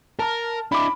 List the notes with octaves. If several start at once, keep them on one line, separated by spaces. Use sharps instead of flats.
A#4 A5 F6
D4 E4 B5 D6